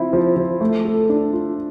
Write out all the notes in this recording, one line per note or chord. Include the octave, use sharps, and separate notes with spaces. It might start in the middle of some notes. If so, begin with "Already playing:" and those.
Already playing: F3 C4 E4
F3
F3
A3
A4
D4
F4